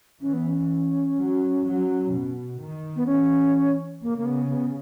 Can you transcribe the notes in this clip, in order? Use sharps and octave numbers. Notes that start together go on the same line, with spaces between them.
E3 C#4
B3
C#4
F#3
F#3
B2
D#3
B3
E3 C#4
C#3 A#3
A#3
B3
B3